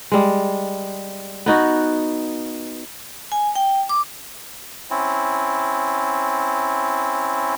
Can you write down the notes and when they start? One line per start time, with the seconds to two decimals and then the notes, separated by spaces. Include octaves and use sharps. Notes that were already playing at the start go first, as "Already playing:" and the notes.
0.12 G3 G#3
1.46 B3 D#4 F#4
3.32 G#5
3.56 G5
3.89 D6
4.90 C4 C#4 E4